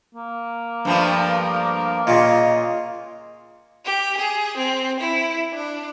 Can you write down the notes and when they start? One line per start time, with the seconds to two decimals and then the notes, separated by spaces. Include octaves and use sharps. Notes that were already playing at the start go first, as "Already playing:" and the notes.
0.15 A#3
0.85 G2 F3 A3
2.07 A#2 C#3 F4 D#5
3.84 G4
4.18 G#4
4.57 C4
5.00 E4
5.53 D4